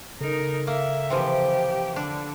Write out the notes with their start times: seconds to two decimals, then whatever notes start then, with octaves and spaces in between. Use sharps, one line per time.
0.21 C#3 D#4 A4 A#4
0.67 A#3 E5
1.10 C3 E3 F3 G4
1.96 D3 D4